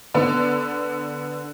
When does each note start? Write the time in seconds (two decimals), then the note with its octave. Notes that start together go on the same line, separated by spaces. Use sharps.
0.14 D3 B3